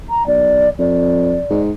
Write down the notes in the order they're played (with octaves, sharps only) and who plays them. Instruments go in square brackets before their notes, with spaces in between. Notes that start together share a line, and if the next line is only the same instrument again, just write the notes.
[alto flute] A#5
[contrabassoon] B1 [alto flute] D5
[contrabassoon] F2 [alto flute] D5
[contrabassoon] G#2